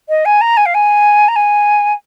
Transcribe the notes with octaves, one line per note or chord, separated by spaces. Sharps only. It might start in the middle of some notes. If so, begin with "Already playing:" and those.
D#5
G#5
A#5
G#5
F5
G#5
A#5
G#5